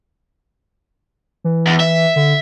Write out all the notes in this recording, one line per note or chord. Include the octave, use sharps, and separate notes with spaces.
E3
E2
E5
D3